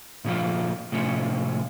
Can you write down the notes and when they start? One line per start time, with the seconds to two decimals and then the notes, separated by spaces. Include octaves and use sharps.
0.25 A#2 C#3 F3 F4
0.92 A2 C3 F3 C#4